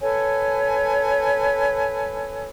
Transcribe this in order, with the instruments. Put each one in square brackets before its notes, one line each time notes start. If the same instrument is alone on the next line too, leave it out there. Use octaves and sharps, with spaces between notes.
[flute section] A4 B4 C#5 G#5